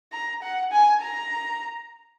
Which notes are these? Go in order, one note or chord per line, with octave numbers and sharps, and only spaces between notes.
A#5
F#5
G#5
A#5